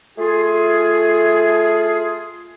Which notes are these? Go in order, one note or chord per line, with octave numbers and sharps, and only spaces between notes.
A3 F4 G#4